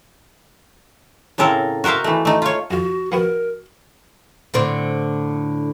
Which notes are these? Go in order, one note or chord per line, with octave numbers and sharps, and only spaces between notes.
A2 C#3 C4 A4 A#4 A#5
F#4 A#4 C5 E5 F5
E3 A3
A3 D#4
F4 C#5
F2 F4 F#4
F3 B3 F#4 A#4
A2 D3 C4